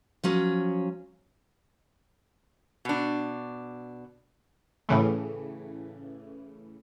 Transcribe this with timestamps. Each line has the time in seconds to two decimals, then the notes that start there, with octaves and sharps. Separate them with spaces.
0.24 F3 F#3 C#4
2.85 B2 D4
4.89 A2 C#3 E3 A3